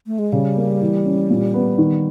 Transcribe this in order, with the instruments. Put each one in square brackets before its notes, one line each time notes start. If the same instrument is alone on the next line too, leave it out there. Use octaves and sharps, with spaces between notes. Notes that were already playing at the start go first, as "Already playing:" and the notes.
[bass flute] A3
G#3
[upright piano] C#3 [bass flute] G3
[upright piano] A#3
E3
C#4
A#2
B3
D#3